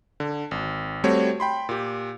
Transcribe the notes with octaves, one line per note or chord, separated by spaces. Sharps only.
D3
G#1
G3 A3 C4 F#4 C#5
G5 B5 C6
A#2 G4